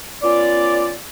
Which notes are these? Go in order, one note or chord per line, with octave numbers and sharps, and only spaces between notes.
B3 C#4 F4 D5